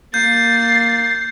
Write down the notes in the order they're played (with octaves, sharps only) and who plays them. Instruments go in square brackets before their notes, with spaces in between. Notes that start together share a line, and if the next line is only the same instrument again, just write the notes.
[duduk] A#3 [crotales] G6 [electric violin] A6 C7